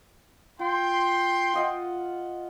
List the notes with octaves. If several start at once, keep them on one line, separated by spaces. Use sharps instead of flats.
F4 G5 C6
F4 D#5 F#5